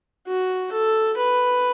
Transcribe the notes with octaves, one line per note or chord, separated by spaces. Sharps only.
F#4
A4
B4